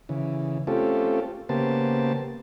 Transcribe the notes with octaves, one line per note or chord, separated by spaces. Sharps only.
C#3 E3
A3 C4 C#4 F4 G4 A4
C#3 A#3 B3 G4 C5 A5